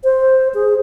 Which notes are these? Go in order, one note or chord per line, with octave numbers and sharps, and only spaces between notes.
C5
G#4